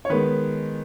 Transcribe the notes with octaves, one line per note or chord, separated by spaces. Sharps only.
C#5
D#3 G#3 B3 B4